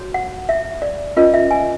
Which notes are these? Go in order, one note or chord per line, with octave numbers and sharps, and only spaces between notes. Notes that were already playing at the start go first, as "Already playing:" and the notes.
Already playing: F#4 C#5
F#5
E5
D5
C#4 F4 A#4 D#5
E5
G#5